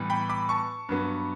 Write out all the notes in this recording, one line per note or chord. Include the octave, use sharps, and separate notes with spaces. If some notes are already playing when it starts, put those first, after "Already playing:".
Already playing: A2 E3 G3 B3
G5 B5
B5 D6
A5 C#6
G2 F#3 B3